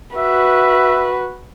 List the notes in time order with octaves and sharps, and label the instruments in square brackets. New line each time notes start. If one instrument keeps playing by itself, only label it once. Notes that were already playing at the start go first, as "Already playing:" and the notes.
[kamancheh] F#4 B4 [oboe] E5